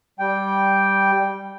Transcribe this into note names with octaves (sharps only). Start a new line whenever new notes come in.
G3 G5